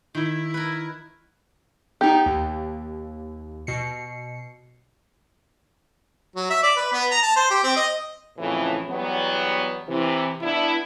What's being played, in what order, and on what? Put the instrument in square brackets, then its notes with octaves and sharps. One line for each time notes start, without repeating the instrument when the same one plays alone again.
[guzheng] D#3 [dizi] E4
[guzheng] A#4 B4
[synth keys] B3 D#4 [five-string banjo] G4
[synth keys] D#2
B2 C7 C#7
[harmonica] F#3
E5
D5
B4
B3
A#5
A5
C5
G4
C4
D#5
[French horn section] F2 A2 C#3 E3 F3
E2 F#3 G3 B3
C3 E3
B3 D4 E4